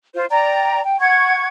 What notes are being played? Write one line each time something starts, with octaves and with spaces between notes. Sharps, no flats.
F4 C5
D5 G5 A#5
G5
F#5 C#6 G#6